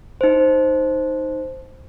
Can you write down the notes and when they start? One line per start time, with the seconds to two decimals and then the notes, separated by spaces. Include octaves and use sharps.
0.21 D#4 C5